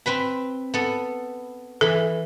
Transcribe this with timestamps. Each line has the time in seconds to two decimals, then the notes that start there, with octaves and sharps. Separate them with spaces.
0.06 C4 B4 B5
0.74 B3 A4
1.81 E3 A4 B5